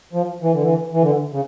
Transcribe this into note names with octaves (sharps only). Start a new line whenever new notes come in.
F3
E3
D3
E3
E3
D3
C#3